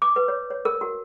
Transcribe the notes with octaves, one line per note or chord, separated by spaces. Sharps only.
D6
B4
C#5
C#5
A#4
F#4